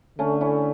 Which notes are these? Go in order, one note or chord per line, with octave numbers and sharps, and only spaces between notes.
D3 A3 C#4
C#4 E4